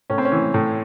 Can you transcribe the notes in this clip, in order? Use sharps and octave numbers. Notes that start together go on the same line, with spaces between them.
A2 C#4
C4
C#4
E3
A2